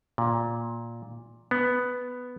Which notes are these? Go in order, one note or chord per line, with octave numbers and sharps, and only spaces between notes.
A#2
B3